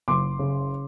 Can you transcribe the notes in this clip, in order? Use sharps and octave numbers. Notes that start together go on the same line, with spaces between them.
F#1 C6 D6
C#3